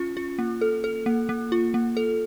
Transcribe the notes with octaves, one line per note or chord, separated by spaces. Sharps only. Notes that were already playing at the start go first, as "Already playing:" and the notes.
Already playing: C#4 F4
F4
A#3
A4
A4
A#3
A#3
F4
A#3
A4